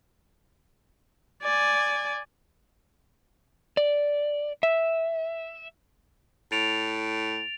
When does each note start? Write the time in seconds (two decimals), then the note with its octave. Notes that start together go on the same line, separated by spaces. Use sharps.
1.43 D5 G#5
3.77 D5
4.63 E5
6.52 A2 A6 D7 F7